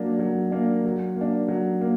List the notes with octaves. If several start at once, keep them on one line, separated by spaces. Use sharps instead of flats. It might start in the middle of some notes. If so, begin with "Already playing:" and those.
Already playing: F#3 A#3 D4
F#3
A#3 D4
F#3
A#3 D4
F#3
A#3